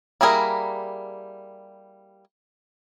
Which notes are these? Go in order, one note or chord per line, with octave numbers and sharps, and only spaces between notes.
G3 A#3 E4 G#4 A#4